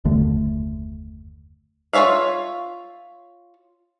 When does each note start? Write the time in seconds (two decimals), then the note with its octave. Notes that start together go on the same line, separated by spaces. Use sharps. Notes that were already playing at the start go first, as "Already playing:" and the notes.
0.05 F#1 D#2 D3 A3
1.93 F4 A#4 C#5 E5 F5